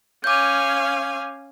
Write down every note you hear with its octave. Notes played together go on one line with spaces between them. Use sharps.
C#4 F5 G#5 D6 G6